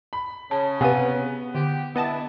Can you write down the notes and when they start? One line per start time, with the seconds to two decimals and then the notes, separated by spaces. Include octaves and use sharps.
0.13 B5
0.51 C#3 A5
0.81 C3 B3 B4 F5 G#5 D#7
1.54 D3 G4
1.96 B3 D4 E4 D#5 A5